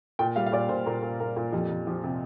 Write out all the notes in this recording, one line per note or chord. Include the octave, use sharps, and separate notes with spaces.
A#2 G5
G3 F5
F5
A#2 D5
A#2 C5
A#2 A#4
A#2
A#2 A#4
A#2
F2 G4
F2
F3 G4
C3